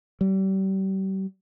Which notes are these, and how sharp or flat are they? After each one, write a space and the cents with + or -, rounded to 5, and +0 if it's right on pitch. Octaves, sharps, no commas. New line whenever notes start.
G3 -35